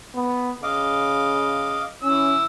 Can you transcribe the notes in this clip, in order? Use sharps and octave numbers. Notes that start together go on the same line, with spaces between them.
B3
C#3 D#5 F5 D6
E3 C#4 E6